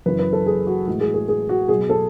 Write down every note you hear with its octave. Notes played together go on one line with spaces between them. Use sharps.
F#2 C#3 E3 B4
B4
A4
G#4
F#4
A2 E3 G#3 F#4
G#4
G#4
G#4
F#4
B2 F#3 G#4
A4